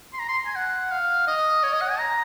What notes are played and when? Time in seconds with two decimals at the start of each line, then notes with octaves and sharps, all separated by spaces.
0.13 C6
0.19 A#5
0.28 C6
0.46 G#5
0.55 F#5
0.91 F5
1.27 D#5
1.63 C#5
1.73 D#5
1.81 F#5
1.90 G#5
1.99 A#5